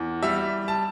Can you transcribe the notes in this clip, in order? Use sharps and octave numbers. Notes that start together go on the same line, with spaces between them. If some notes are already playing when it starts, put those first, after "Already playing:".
Already playing: E2
G3 E5
A5